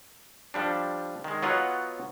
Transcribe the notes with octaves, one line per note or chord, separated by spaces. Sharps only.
F3 G3 D4
D#3 G#3
F#3 B3 F4 C#5 D#5 F#5